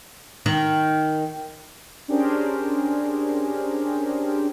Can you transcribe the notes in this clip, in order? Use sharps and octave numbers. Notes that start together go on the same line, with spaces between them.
D#3
C#4 D4 G4 G#4 A#4 C5